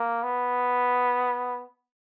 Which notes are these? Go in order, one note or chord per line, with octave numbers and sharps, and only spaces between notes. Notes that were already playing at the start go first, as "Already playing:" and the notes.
Already playing: A#3
B3